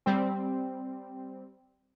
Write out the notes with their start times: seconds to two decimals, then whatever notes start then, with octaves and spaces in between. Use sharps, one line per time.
0.06 G3 C4